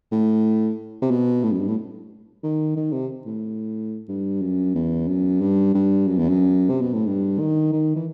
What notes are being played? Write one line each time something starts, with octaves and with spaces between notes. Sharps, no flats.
A2
C3
B2
A2
F#2
G2
A2
D#3
D#3
C3
A2
G2
F#2
E2
F#2
G2
G2
F#2
E2
F#2
C3
B2
A2
G2
D#3
D#3
E3